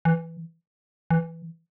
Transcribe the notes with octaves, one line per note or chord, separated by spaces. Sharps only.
E3
E3